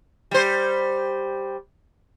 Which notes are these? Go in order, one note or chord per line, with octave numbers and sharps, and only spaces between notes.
G3 C5